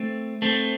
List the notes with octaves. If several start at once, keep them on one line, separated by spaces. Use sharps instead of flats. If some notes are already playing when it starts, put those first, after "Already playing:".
Already playing: A3 C4
A3 C4